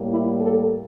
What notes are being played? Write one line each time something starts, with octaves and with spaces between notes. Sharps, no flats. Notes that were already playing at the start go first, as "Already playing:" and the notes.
Already playing: A2 G3 A#3
E4
A4